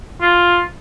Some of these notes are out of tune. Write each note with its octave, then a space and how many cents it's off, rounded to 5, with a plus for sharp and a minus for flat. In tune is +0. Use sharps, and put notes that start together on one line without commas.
F4 +5